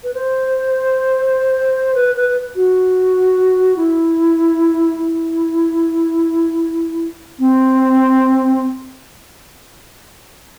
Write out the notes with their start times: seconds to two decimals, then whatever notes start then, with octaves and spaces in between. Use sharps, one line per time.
0.04 B4
0.14 C5
1.95 B4
2.15 B4
2.56 F#4
3.76 E4
4.98 E4
7.39 C4